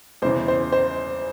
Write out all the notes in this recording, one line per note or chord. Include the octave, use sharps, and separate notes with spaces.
E2 C#3 E3 C5
C5
C5